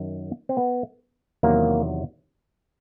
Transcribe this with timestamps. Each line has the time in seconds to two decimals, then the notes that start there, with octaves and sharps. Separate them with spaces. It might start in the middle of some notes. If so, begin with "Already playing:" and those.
Already playing: F#2 D#3 F#3
0.49 C4
0.57 B3
1.43 E2 C3 D#3 F#3 A#3